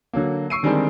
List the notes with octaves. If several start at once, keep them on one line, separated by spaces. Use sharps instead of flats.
D3 F#3 A#3
C#6 E6 C7 D7 D#7
D3 D#3 G3 G#3 C4 D4